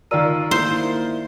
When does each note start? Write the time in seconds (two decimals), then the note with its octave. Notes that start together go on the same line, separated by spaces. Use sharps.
0.11 D#3 F4 A#4 D5 E6 D#7
0.51 A#3 E4 C5